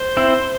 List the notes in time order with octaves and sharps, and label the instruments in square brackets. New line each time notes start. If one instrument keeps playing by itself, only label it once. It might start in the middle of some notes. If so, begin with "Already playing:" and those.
Already playing: [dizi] C5
[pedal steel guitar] C4 E4